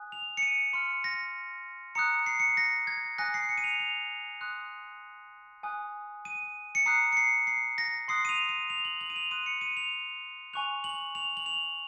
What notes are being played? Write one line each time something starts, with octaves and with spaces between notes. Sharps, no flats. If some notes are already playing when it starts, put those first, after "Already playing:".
Already playing: G#5 D#6 F#6
F7
C#7
D#7
C6 F6 C#7
A#6
A#5 D#6 F#6 C#7
C7
C#7
C7
A#6
G#6
G#5 D#6 F#6 A#6
C7
C#7
D#7
F7
F7
C6 D#6 F#6
G#5 D#6 F#6
D#7
C#7
A#5 D#6 F#6 C7
C#7
C7
C7
A#6
C6 D#6 F#6 C7
D#7
F7
D#7
F7
F#7
F#7
D#7
F7
C6 D#6 F#6 D#7
C#7
D#7
F7
G#5 C#6 F#6 F7
F#7
F7
F#7
F7